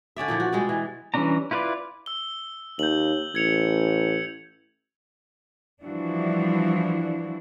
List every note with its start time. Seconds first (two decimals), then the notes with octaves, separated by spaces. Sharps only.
0.16 D3 C#4 D5 E5
0.28 A#2 E3 F3
0.40 F#4
0.53 B2 G3 G#3
0.69 E3
1.14 E3 G3 C#4 D4 A#5
1.51 E4 F4 B4 C5 D5
2.06 E6 G7
2.79 D#2 G6 F#7
3.35 A1 G#6 C#7 F7
5.83 E3 F3 G3 D4 E4 F#4